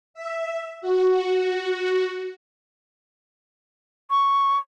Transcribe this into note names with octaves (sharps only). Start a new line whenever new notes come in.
E5
F#4
C#6